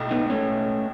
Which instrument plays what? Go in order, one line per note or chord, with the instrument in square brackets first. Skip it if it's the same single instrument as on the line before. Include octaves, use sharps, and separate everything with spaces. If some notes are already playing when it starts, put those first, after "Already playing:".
Already playing: [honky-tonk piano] B1 A2 G#3
[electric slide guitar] B3 D#4
B3
A3 C#4